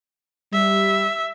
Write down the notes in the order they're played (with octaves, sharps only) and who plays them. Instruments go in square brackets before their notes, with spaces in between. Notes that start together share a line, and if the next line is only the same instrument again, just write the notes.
[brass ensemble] G3 [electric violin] E5